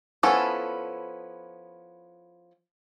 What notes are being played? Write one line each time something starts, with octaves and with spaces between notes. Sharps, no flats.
F3 B3 C#4 E4 A4